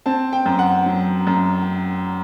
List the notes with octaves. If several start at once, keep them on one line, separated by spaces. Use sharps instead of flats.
C4 A5
G5
F#2
F#5
F#3
F#2